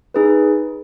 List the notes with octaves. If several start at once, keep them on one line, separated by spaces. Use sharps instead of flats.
D#4 G#4 B4